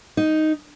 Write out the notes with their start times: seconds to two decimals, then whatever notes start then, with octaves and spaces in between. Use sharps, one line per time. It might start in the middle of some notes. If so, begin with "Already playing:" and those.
0.17 D#4